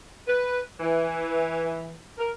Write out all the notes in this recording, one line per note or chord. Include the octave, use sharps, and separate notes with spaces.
B4
E3
A#4